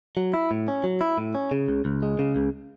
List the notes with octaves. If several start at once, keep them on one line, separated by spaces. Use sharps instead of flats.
F#3
E4
A2
C#4
F#3
E4
A2
C#4
C#3
C#2
C#2
G#3
C#3
C#2